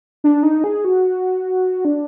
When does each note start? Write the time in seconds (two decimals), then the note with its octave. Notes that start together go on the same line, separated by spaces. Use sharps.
0.24 D4
0.43 D#4
0.64 G#4
0.85 F#4
1.85 D4